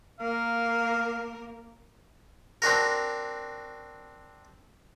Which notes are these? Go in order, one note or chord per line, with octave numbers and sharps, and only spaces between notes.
A#3 A#4 F5
C4 D4 F#4 A#4